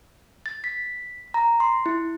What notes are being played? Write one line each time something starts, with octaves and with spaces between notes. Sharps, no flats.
A6
B6
A#5
C6
E4